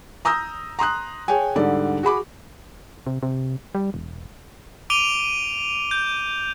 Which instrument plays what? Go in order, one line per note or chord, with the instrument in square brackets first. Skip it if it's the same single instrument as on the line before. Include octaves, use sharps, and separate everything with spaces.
[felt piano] A#5 D#6 E6 G6 A#6
A#5 C6 D#6 F#6
G#4 C#5 G5 G#5
G#2 D3 G3 A4 D5
F#4 G#4 B5 D6
[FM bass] C3
C3
G3
E1
[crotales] D6 D7 D#7 F7 G7
G6